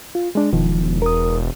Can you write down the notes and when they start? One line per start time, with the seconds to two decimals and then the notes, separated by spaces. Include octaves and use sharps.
0.15 F4
0.35 G#3 D4
0.52 E1 B2 D#3 F3
1.02 A#4 D#6